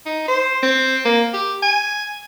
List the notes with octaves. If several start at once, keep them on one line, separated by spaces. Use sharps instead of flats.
D#4
C5
C4
A#3
G4
G#5